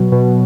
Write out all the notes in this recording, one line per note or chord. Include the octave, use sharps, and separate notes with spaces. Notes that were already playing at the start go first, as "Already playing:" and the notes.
Already playing: B2 F#3
B2